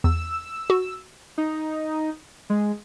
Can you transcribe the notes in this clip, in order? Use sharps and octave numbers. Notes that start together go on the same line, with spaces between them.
E2 E6
F#4
D#4
G#3